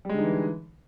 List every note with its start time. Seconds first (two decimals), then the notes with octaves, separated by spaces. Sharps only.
0.05 G3
0.09 G#3
0.14 D3
0.19 D#4
0.23 E3